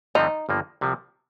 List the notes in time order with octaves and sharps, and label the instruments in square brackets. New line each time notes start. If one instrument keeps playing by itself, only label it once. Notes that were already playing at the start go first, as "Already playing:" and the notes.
[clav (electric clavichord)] G2 D3 F3 A3 C4 [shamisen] D#4
[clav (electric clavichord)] G1 G2 F3 A#3
C2 C3 F3